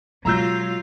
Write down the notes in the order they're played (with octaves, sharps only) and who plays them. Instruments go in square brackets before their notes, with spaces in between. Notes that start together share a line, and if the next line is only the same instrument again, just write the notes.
[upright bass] B2 G#3 [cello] F#3 [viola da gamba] F4 [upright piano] A#5 E6 G6